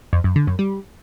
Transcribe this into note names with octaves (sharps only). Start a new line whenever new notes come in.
F2
F#2
D3
F#2
G3